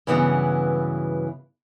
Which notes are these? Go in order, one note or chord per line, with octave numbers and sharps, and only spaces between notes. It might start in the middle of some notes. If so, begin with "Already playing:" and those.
G2 C#3 E3 F#3 B3 E4